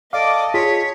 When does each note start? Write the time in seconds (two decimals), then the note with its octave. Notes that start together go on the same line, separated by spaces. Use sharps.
0.13 A4 D5 D#5 F5 D6
0.54 F4 G#4 C#5 B6